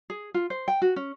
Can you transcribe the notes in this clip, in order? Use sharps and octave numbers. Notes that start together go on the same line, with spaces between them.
G#4
F4
C5
G5
F#4
C#4